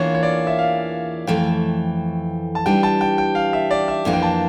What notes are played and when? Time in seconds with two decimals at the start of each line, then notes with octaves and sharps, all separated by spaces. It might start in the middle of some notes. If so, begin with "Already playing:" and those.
Already playing: E2 E3 A#3 D4 F4 C#5
0.15 C#5
0.23 D5
0.47 E5
0.58 F5
1.27 F2 E3 A3 G5
2.55 A5
2.66 E3 G3 D4 G4 G5
2.83 A5
3.01 G5
3.18 G5
3.35 F5
3.53 E5
3.71 D5
3.88 E5
4.05 F2 E3 A#3 D4 G4
4.13 G5
4.22 A5